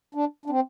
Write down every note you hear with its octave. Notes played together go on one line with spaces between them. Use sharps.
D4
D4
C4